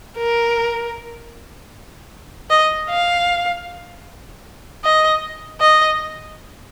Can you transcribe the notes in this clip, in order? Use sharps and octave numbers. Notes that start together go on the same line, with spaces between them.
A#4
D#5
F5
D#5
D#5